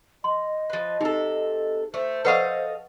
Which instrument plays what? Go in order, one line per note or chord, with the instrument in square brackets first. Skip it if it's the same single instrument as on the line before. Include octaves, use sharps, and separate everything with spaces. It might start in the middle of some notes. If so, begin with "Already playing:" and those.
[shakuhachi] D#5 [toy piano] C6
[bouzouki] F3 B4
[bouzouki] C3 A4 [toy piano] D#4
[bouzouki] A3 [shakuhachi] C5
[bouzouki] A4 D#5 F5 [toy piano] B4 F#5 C#6